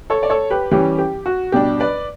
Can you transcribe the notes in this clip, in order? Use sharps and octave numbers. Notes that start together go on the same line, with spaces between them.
A4 C#5
D5
A4 C#5
G4 B4
E3 G3 C#4 G4
G4
F#4
B2 G3 D4 G4
B4 D5